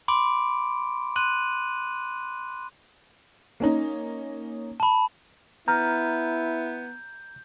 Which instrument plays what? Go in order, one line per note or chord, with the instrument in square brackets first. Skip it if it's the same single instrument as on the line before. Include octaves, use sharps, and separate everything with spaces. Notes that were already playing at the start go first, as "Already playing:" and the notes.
[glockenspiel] B5 C6 D6 D7
C6 F#6 D#7 F#7
[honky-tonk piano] A#3 C#4 D#4
[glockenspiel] A5 B5
[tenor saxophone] B3 [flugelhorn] E4 [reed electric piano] A#5 F6 [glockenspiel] G6